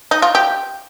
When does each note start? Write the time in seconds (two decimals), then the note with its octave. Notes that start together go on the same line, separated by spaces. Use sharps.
0.11 D#4
0.22 F4
0.35 G4